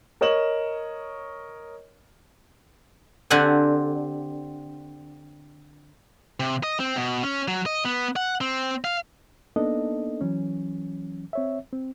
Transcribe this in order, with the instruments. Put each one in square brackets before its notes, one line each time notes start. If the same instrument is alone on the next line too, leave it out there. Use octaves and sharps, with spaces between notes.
[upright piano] A#4 C#5 D#5 E7 F#7
[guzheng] D3 C4 G4 F#5 G#5
[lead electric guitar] C3
D#5
C4
B2
C#4
F#3
D#5
B3
F#5
C4
F5
[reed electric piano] A#3 B3 D4 D#4 A4 D#5
E3 F#3 C#4
C4 C#5 E5
C4